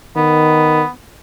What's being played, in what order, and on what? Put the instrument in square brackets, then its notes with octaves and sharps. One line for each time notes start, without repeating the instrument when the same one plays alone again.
[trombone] D#3 [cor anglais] B3